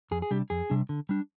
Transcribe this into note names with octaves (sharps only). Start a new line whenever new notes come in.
F2 G#4
G#4
C3 G3 D4 G4
F2 G#4
C3 G3 D4
D3
G3 D4